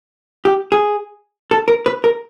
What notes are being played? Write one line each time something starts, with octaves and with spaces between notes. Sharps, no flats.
G4
G#4
A4
A#4
B4
A#4